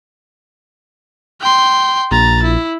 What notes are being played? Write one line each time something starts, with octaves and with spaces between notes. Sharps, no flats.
G5 C6
A#1 A#5 A6
E4